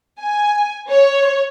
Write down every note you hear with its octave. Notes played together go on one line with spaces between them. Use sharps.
G#5
C#5